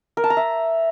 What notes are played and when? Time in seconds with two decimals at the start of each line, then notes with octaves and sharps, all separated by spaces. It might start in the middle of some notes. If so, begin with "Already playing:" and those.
0.17 A#4
0.24 A5
0.30 A#5
0.37 E5